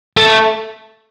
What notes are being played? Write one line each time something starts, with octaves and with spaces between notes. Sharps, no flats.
A3